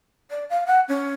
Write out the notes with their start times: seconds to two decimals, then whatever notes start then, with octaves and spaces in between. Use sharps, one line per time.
0.30 D5
0.50 F5
0.66 F#5
0.88 C#4